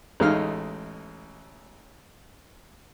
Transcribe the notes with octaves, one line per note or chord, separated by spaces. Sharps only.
A1 G#3 A3 D#4 F5 F6